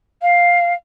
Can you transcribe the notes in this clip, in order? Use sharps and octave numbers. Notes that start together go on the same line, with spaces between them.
F5